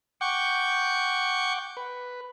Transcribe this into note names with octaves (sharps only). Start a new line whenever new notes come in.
F#5 G5 C#6 D6 G6
B4